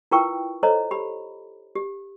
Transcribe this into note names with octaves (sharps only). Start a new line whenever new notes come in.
E4 F4 A#4 B4 G5 C#6
A4 C5 C#5 D#5 A#5
G4 B5
G4